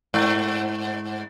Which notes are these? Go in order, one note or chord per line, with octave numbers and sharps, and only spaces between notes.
G#2